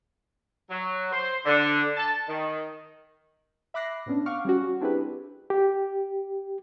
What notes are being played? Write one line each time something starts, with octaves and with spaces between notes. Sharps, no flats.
F#3
C5
D3
A5
D#3
E5 B5 D6 F#6 A#6 C7
A2 B3 C#4 D4
F5 F#5 C#6 D6 F6
G3 C#4 F#4
C4 D4 E4 G4 G#4 B4
G4